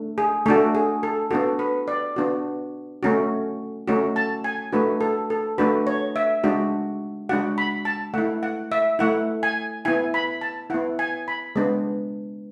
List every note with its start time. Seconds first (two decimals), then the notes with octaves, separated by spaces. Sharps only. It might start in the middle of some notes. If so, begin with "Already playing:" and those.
Already playing: A3 D4
0.18 G#4
0.46 A3 D4 F#4 A4
0.75 G#4
1.03 A4
1.31 B3 D4 F#4 A4
1.59 B4
1.88 D5
2.16 B3 D4 F#4
3.03 A3 C#4 F#4
3.88 A3 C#4 F#4
4.16 A5
4.44 G#5
4.72 A3 D4 F#4 B4
5.01 A4
5.30 A4
5.58 A3 D4 F#4 B4
5.87 C#5
6.16 E5
6.44 G#3 D4 F#4
7.29 G#3 D4 F#4 F#5
7.58 B5
7.85 A5
8.14 A3 E4 F#5
8.43 F#5
8.72 E5
8.99 A3 E4 F#5
9.43 G#5
9.85 B3 E4 G#5
10.14 B5
10.41 A5
10.70 B3 E4 F#5
10.99 G#5
11.28 B5
11.56 G#3 B3 D4